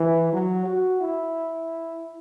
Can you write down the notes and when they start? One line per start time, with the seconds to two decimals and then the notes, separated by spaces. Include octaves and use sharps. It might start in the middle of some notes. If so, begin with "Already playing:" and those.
Already playing: E3
0.33 F#3
0.66 F#4
1.00 E4